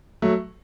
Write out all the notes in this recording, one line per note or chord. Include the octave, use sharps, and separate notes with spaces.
F#3 A3